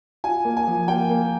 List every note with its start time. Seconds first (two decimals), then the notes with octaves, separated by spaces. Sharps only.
0.24 F4 G#5
0.45 A#3
0.57 G#5
0.68 F3
0.88 A#3 G5
1.10 A#3